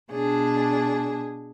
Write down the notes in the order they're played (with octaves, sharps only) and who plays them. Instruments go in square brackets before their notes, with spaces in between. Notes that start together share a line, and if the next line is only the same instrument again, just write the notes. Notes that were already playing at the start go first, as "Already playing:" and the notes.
[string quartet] B2 D4 G#4